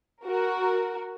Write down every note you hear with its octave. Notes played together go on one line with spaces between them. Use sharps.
F#4 A#4